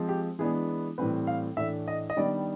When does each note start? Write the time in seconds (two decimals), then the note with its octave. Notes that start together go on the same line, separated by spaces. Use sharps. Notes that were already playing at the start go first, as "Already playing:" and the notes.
Already playing: F3 G#3 C4
0.09 G4
0.39 E3 G#3 B3 D4 G#4
0.98 A2 E3 G3 C4 B4
1.27 F5
1.57 A2 E3 A3 D4 E5
1.88 D#5
2.10 D#5
2.17 D#3 G3 B3 D4 D5